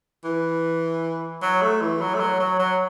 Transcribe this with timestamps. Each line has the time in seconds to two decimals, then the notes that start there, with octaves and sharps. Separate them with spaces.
0.25 E3
1.42 F#3
1.62 A3
1.81 E3
2.01 F#3
2.14 A3
2.20 F#3
2.40 F#3
2.59 F#3